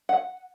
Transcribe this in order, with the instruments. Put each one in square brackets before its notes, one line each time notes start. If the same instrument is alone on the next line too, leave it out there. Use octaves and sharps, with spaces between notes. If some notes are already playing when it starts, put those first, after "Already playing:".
[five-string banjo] F#5